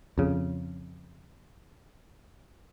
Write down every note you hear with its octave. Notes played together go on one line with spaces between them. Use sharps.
F2 C#3